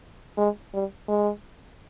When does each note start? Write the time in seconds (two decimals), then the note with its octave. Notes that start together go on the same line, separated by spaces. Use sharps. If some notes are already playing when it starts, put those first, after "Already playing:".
0.38 G#3
0.73 G3
1.09 G#3